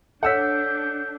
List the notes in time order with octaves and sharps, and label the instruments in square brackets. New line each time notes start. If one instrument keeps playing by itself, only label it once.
[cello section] D4 [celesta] A4 C#5 [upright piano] F#5 E6 B6 [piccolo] G6